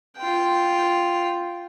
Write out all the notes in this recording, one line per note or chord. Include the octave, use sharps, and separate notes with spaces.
F4 G5